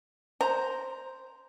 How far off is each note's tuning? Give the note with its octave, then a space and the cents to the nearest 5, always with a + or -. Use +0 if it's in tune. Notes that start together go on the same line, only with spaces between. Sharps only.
C5 +0 A#5 +0